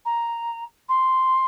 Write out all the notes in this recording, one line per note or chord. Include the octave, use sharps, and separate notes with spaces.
A#5
C6